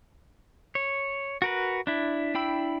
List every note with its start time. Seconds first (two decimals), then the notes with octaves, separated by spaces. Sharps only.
0.75 C#5
1.42 F#4 A#4 B4
1.87 D4 E4
2.35 D4 E4 G5 B5 E6